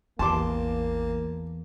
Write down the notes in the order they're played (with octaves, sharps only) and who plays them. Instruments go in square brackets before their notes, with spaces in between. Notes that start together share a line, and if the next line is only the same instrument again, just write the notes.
[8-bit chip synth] A1 [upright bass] E2 E3 [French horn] A#3 [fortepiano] A5 C6 D6